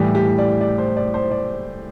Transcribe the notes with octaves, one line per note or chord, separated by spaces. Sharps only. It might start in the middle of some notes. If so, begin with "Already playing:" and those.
Already playing: A2 E3 G3 G4
G4
D5
D5
C5
D5
C5
D5